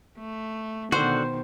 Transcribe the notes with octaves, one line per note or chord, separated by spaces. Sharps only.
A3
B2 D3 D#3 F#4 C5